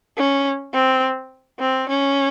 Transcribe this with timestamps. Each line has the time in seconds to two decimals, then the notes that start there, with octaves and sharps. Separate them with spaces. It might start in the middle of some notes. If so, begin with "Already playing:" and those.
0.17 C#4
0.73 C4
1.59 C4
1.89 C#4